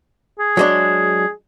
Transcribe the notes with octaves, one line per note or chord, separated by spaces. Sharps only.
G#4
F#3 G#3 D4